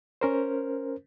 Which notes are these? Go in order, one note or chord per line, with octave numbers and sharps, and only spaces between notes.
C#4 A#4 C5